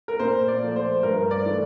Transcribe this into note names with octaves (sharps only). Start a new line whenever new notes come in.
A#4
A#2 C5
D5
F3 A3
C5
G2 A#4
D5
E3 A3